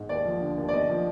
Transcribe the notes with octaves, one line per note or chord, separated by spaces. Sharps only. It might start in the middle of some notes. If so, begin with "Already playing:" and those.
Already playing: G#2
D#2 D5
F3
D3
D#2
D5
D#2 D#5
F3